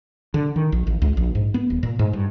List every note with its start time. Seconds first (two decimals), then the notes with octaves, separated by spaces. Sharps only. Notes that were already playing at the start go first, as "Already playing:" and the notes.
0.34 D3
0.56 D#3
0.72 A#1
0.87 A1
1.02 C#2
1.17 A#1
1.35 G#2
1.54 B3
1.70 D#1
1.83 A#2
1.99 G#2
2.13 G2